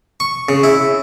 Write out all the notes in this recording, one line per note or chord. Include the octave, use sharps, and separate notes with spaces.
C#6
C#3
E4